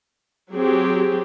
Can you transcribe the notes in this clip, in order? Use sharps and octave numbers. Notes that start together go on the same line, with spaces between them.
F#3 C4 G4 G#4